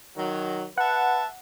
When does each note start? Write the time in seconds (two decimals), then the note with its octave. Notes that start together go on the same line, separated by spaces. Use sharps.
0.17 D#3 F#3
0.78 B4 E5 F#5 A5